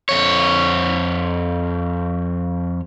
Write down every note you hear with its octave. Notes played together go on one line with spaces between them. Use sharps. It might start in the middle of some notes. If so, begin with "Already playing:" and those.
F2 C#5